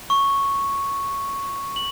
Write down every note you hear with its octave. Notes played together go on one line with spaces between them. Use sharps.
C#6
F#7